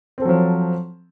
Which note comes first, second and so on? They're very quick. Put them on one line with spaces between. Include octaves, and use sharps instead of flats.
C4 A4 F#3 F3